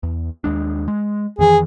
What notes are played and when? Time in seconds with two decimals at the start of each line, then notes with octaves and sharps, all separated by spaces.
0.03 E2
0.44 D#2 G#3 D4
0.88 G#3
1.39 F2 D#3 E3 G#4